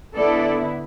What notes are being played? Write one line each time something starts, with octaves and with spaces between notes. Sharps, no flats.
D3 B3 E4 A4 D5